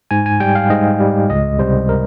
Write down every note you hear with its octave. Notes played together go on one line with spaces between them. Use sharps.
G#2 G#5
G#5
G3 G5
F5
G#2 D#5
G3
C#2 D#5
C3 G3 C5
A#4